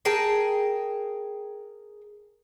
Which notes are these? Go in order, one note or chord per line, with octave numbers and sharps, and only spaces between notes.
G#4 A#4 G5 A5